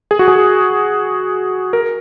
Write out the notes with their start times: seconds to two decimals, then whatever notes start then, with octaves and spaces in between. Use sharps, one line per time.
0.11 G#4
0.19 F#4
0.28 G#4
1.73 A#4